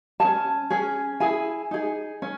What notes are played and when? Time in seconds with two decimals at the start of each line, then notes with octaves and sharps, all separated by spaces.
0.20 G#4 A5
0.24 C#4
0.70 C#4 G#4
1.20 E4 G#4 G#5
1.71 D#4 G#4
2.22 C#4